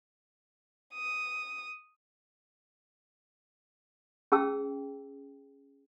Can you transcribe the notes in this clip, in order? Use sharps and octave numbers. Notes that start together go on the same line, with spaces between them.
D#6
C#4 G#4 G5 A5 E6